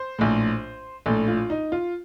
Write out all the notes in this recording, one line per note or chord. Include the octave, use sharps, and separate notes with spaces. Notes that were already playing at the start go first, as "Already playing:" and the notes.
Already playing: C5
A#1 A2
A#1 A2 A4
F4
D#4
F4